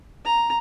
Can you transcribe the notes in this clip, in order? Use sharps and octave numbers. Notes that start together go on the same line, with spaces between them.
A#5